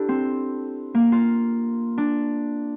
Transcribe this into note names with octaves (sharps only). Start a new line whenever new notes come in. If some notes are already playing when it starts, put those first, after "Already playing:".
Already playing: D4 E4 G4 A4
C4
A#3
F4
D4